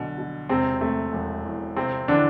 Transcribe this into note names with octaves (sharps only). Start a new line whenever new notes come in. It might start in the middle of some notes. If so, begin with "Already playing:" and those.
Already playing: B1 B2 D3
B2
E1 C3 C4
C3 A3
E1
E2
G1 C3 C4
D3 E3 D4